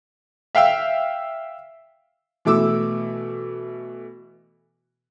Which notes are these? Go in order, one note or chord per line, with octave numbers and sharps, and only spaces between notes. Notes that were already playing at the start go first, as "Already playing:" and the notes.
E5 F5 G5 E6
B2 E3 A3 D6 E6